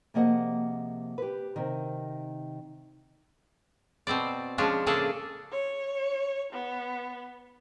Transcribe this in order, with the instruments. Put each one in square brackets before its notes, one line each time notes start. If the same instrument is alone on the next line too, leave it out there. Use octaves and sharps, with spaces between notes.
[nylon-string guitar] C3 F3 A#3 G#4 D#5 F#5
G4 B4
C3 D#3
[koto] B2 C4 C5 D5
F3 G#3 C#4 D4
A2 C#3 A#3 D4 G#4 A4
[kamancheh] C#5
B3